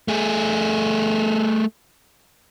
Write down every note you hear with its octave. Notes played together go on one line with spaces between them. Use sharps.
A3 G#4